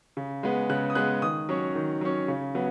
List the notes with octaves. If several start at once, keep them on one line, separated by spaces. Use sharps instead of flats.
C#3
G#3 B3
C#3 F#6
D#6
G#3 B3 F#6
D#3 D#6
F#3 C#4
D#3
F#3 C#4
C#3
F#3 B3